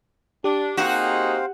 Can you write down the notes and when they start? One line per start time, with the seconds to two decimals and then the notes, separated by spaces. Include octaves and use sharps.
0.44 D4 G4
0.77 A#3 C4 D#4 F#4 G#4 C5 F5